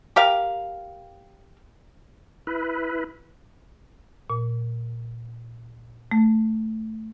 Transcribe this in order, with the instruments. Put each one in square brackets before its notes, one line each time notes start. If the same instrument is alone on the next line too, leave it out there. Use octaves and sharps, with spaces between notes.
[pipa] G4 A#4 F5
[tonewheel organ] E4 B4
[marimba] A#2
A3